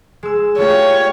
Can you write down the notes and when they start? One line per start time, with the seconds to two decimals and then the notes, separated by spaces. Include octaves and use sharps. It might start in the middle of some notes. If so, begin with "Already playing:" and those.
0.23 G#3 E6
0.58 A3 F4 G4 C#5